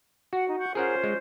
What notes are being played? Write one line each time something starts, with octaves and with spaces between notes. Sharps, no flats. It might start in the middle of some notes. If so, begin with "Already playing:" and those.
F#4 F#5
D#4
F#5 C#6 G6
C#4 F4 G#4 A#4 C5 F#5
G#3